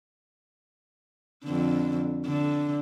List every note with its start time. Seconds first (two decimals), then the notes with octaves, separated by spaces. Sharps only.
1.45 F2 D3
2.26 D3